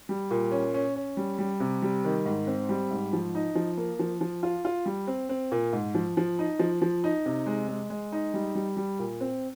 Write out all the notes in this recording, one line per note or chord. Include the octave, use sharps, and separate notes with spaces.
G3
A#2
C#4
C#4
C#4
G3
G3
C3
G3
D#3
G#2
C4
G3
G#2
F3
D#4
F3
A#3
F3
F3
F4
F4
G3
C4
C4
A#2
G#2
F3
F3
D#4
F3
F3
D#4
C3
G#3
G#3
G#3
D#4
G3
G3
G3
A#2
C4